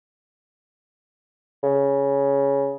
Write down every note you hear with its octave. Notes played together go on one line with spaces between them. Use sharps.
C#3